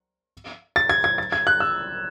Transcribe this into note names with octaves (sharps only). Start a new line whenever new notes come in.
A6
G#6
G#6
A6
G#6
F#6
E6